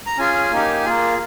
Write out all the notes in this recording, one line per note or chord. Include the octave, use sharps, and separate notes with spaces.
A#5
C#4 F4 G#4 G#5
A#3 D#4 G4
A#3 F4 G#4